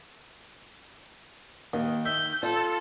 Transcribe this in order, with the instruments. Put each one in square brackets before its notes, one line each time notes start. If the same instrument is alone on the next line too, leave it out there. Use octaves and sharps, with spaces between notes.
[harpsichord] D#2 [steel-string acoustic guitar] D#3
[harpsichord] E5 [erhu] G6
[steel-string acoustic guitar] F4 [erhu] A4